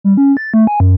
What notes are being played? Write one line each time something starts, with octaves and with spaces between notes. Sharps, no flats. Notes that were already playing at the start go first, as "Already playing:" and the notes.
G3
C#4
A6
A3
G#5
F#2